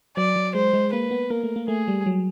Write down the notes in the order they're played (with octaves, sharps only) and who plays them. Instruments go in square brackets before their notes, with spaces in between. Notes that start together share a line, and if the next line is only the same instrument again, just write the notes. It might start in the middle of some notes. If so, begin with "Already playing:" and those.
[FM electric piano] F#3 [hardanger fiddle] D5
[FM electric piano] F#3
[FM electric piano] G#3 [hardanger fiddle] C5
[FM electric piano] G#3
[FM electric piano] A#3 [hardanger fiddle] B4
[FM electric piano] B3
[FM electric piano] A#3 [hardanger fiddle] A#4
[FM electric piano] A3
A#3
[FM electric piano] A3 [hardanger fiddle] G#4
[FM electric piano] G3
F#3